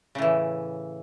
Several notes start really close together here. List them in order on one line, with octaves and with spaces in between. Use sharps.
C#3 A2 E3